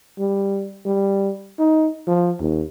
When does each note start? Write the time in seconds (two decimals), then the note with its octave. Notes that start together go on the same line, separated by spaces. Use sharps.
0.19 G3
0.85 G3
1.59 D#4
2.07 F3
2.40 D#2